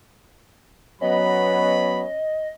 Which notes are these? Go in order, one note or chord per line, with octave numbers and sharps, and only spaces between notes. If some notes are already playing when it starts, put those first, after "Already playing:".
F#3 B3 C#4 D#5 B5